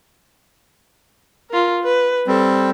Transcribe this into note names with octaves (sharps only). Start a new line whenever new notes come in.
F4 A#4
B4
G3 C4 A4